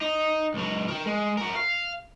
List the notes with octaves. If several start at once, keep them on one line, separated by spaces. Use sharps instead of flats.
D#4
C#2 F#3
A#4 G5
G#3
F#4 A#4
F5